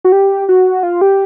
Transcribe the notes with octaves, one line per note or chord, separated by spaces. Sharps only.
F#4
G4
F#4
F4
G4